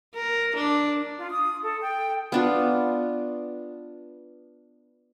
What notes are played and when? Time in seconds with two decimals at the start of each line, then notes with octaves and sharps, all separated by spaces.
0.16 A#4
0.57 D4
1.18 F4
1.31 D#6
1.63 A4
1.81 G5
2.32 B3 D4 F4